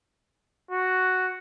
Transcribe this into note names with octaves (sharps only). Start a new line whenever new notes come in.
F#4